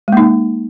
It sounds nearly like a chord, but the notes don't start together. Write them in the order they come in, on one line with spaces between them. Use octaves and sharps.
G#3 A#3 D#4